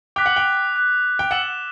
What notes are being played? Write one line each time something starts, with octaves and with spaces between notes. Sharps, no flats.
G5 D6 F#6 B6
F#5
G5
D6 F#6 B6
G5
F#5 E6 A6 E7 G7